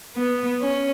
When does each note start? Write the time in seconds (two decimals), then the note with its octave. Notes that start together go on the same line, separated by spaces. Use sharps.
0.16 B3
0.60 C#4